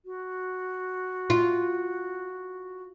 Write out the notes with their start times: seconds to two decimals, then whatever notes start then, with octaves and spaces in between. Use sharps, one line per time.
0.05 F#4
1.30 F4